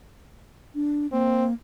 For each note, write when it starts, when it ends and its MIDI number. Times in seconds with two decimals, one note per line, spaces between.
0.75 1.07 62
1.12 1.53 58
1.12 1.45 60